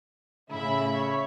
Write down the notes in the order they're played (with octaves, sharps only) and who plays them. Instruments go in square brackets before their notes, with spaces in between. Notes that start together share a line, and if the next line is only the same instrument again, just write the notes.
[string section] A2 E5 B5 [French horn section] C#3 [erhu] E4
[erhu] C#5